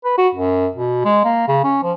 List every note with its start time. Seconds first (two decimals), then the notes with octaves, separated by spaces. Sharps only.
0.04 B4
0.18 F#4
0.35 F#2
0.75 B2
1.05 G#3
1.24 A#3
1.47 C#3
1.64 C#4
1.83 F3